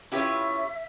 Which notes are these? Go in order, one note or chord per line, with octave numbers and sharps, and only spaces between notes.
C#4 E4 F4 G4 B4 C#5 E5